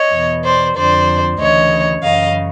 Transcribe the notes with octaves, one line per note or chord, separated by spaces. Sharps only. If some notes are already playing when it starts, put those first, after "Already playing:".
Already playing: C#5 D#5
E2 B2
C5 D5
F2 D3 C5 D5
D2 C#3 E3 C#5 D#5
F#2 C#3 E3 D#5 F5